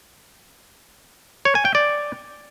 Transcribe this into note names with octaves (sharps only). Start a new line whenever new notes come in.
C#5
G#5
G5
D5